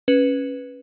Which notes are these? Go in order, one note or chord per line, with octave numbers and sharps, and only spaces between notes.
C#4 B4